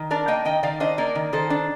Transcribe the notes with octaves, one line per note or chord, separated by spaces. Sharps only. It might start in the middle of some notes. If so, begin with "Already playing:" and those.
Already playing: D#3
D4 A#4 D5
A#3 D#5 G5
D#3 D#5 G5
D#3 D5 F5
D4 C5 D#5
A#3 A#4 D5
D#3
D#3 A4 C5
D4